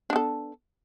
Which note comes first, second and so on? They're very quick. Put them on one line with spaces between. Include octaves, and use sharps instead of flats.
D4 B3 A4